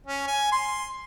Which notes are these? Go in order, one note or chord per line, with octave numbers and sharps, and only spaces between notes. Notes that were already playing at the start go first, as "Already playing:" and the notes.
C#4
G#5
C6